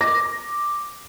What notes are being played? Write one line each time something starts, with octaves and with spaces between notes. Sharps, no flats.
D6 A#6